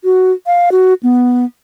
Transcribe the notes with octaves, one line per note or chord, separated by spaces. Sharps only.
F#4
F5
F#4
B3